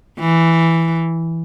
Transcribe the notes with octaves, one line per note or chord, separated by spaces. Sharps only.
E3